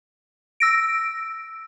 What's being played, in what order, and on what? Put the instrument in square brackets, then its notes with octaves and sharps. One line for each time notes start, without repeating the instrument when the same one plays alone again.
[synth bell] E6 A#6 D7